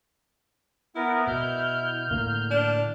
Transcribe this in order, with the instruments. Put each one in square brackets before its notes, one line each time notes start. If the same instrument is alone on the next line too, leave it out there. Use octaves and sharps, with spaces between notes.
[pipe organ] B3 A#4 [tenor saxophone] E4
[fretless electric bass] B2 [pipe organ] F6 G6
[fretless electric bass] A2 D3 A#3
[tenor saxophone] D4